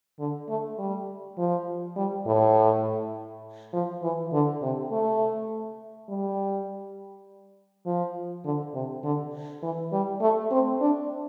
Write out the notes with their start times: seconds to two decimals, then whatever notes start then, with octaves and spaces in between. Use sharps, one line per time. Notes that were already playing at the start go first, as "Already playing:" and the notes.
0.19 D3
0.49 A3
0.79 G3
1.38 F3
1.96 G3
2.26 A2
3.73 F3
4.02 E3
4.33 D3
4.62 C3
4.91 A3
6.09 G3
7.86 F3
8.45 D3
8.74 C3
9.04 D3
9.63 E3
9.92 G3
10.21 A3
10.51 C4
10.81 D4